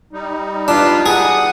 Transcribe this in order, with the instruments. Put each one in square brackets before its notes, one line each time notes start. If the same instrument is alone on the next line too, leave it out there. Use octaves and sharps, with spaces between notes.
[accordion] G3 D#4
[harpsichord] D4 [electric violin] F4 B4
[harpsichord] G#4 [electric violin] F#5 D#6